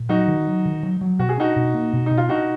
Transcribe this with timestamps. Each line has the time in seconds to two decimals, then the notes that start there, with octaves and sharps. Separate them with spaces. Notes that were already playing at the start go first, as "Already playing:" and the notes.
Already playing: A#2
0.09 F#3 D#4 F#4
0.27 D#3
0.47 F#3
0.65 D#3
0.83 F#3
1.01 F#3
1.19 B2 F#4
1.29 G#4
1.38 D4 D#4 F#4
1.56 B2
1.74 A#3
1.93 B2
2.06 B2 D#4
2.17 F4
2.29 D4 D#4 F#4